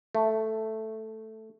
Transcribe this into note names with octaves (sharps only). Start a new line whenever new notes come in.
A3